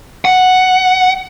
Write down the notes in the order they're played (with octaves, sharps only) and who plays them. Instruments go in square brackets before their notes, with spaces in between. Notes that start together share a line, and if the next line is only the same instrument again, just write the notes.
[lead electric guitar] F#5